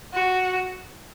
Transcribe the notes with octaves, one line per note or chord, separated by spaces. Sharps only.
F#4